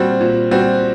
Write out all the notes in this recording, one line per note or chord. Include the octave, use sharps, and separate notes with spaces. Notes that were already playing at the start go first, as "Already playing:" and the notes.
Already playing: A#2 G3 C4 F#4
A#2
G3 C4 F#4